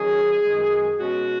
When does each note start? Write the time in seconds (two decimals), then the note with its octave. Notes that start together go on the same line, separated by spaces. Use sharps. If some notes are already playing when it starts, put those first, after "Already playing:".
Already playing: D#3 F#3 C#4 G#4
0.44 F#2 D#3 G#3 D#4
0.99 B2 G#3 C#4 F#4